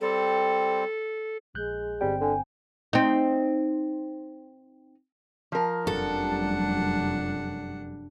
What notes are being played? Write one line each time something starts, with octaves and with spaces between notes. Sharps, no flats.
G3 C4 A4
A#1 G#3 F#6 G6
G1 G3 C4 G5
D3 G#5
C4 D#4
F3 A#4
F1 F#2 G3 D4 A4 F#5